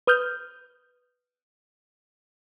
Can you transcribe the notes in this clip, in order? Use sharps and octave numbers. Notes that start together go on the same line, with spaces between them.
B4 D#6 F6 G6